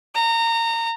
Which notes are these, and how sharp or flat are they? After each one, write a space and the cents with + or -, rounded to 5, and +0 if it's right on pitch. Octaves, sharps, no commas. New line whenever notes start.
A#5 -25